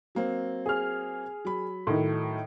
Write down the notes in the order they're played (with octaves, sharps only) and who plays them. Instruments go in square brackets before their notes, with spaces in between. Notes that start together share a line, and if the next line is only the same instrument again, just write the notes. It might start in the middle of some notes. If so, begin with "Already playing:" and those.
[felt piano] F#3 A#3 C4
[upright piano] G#4 F6
[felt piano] F#3 B5
[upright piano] A2 D#3